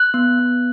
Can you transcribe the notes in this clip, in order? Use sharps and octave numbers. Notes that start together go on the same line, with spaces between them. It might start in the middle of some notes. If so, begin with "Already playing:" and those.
Already playing: F#6
B3
B3